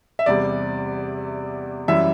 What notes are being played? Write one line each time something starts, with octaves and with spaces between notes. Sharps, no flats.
E5
E2 C3 G3 D5
F#2 E3 G3 E5